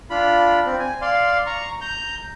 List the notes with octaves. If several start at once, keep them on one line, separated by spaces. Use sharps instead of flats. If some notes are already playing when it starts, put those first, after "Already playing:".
D4 F4 B5
C4
G#5
D5 F5 C6
A#5 C#6
A#5 G6